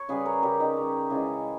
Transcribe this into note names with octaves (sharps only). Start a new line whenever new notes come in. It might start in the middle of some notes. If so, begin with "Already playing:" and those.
Already playing: C#5
C#3 G3 G#4 B4
A#4 C#5
C#3 G3 G4 A#4
D#4 G4
C#3 G3
C#3 E3 G#3 E4 G#4